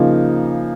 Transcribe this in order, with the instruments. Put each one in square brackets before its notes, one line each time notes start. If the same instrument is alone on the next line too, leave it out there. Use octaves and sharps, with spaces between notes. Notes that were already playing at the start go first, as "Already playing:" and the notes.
Already playing: [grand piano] C#3 F3 A#3 D#4